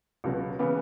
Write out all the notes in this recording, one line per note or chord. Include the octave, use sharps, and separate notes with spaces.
C#2 B2 F#3
C#3 E3 B3